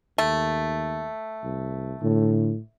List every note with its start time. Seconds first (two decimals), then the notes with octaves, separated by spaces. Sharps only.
0.18 D#2 A3
1.44 C2
2.02 A2 D3